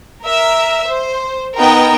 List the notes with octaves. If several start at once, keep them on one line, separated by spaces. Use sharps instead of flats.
A#4 E5
C5
B3 D#4 A#4 D#5 G5